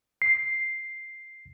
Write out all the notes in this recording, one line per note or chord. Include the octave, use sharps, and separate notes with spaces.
C7